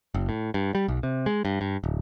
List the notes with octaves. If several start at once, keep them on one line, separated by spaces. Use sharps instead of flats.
F#1
A2
G2
G3
B1
C3
G#3
G2
G2
D1